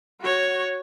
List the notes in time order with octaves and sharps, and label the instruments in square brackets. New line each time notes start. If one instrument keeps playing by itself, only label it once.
[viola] F#4 C#5